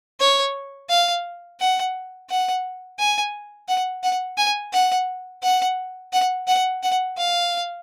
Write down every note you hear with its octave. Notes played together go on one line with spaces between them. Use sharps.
C#5
F5
F#5
F#5
G#5
F#5
F#5
G#5
F#5
F#5
F#5
F#5
F#5
F5